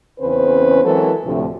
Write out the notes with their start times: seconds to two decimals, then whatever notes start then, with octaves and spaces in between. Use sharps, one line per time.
0.19 E2 C#3 C4 C#4 B4 C5
0.84 E3 F#3 G#3 C4 A4 A#4
1.24 D2 A2 C3 F3 A3 D4